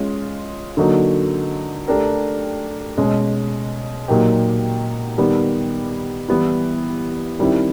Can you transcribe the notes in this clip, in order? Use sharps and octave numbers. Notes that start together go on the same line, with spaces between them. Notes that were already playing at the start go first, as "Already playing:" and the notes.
Already playing: G#3 C#4 F4
D3 F#3 A#3 D#4 F#4
A3 D4 G4 A#4
B2 G#3 C#4
A#2 F#3 A#3 D#4 G4
D#3 G3 B3
E3 G3 B3 E4
D#3 G3 C4 E4